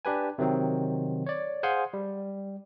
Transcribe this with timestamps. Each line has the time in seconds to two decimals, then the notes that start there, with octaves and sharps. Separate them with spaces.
0.05 D4 G4 B4 G#5
0.38 C3 D#3 F#3 C4
1.26 C#5 D5
1.63 G#4 C5 F5 F#5 G#5 C6
1.94 G3